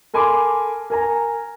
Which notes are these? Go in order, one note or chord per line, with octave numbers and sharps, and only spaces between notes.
A4 A#4 G#5 B5 C6 D6
A#4 G#5 A#5